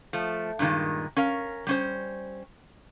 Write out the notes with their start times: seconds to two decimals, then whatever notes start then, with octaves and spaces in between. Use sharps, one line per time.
0.13 F3 A3
0.59 G2 A#2 D#3 G#3
1.16 C#4 A#4 F5
1.67 G3 C#4 C5